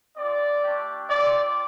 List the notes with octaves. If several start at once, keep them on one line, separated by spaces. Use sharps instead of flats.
C4 F4 D5
A3 D4 G4
C4 F4 D5